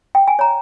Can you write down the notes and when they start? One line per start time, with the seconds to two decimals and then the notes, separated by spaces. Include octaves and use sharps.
0.15 G5
0.28 G#5
0.39 C#5 A#5